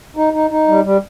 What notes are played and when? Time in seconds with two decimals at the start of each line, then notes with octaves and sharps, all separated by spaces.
0.17 D#4
0.33 D#4
0.50 D#4
0.68 G3
0.84 G3